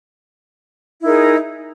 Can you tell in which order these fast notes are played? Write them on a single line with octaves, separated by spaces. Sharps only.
E4 D#4 A#4 G#4